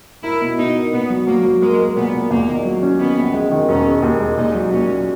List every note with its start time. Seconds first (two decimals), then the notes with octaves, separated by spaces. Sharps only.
0.23 E4 A#4
0.41 B2
0.58 B2 D#4
0.76 A#4
0.93 A#2 B3
1.10 F#3
1.27 F#3 A#3
1.45 F#3
1.62 G#3 A#3
1.79 A#3
1.96 A#2 B3
2.14 A#2
2.30 E2 A#3
2.48 D#3
2.65 F#3
2.83 C#4
3.00 D#3 B3
3.17 A#1
3.34 G#3
3.51 D#3
3.68 E1 C#4
3.86 G#3
4.03 D#2
4.21 G#3
4.37 A#2 D#4
4.55 F#3
4.72 A#2 C#4
4.90 F#3